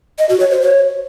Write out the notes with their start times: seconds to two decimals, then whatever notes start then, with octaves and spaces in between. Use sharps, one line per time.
0.19 D#5
0.29 F#4
0.40 C#5
0.51 C5
0.61 C#5